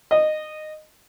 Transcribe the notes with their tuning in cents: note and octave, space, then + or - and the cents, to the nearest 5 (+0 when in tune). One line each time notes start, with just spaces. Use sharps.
D#5 -15